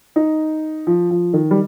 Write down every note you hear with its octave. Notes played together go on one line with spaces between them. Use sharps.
D#4
F3
F3
D#3
G3